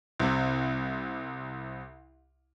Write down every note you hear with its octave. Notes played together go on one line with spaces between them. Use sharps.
C2 C3